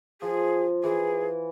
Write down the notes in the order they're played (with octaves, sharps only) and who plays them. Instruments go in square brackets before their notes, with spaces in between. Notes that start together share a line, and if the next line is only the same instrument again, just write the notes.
[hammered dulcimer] F3 [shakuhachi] G#4
[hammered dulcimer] E3 [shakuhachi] G#4